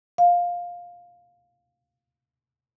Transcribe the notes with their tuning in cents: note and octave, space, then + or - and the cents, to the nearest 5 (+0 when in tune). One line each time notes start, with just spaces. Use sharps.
F5 +10